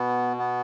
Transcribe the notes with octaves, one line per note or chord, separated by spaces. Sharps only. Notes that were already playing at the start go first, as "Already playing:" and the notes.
Already playing: B2 B3
B3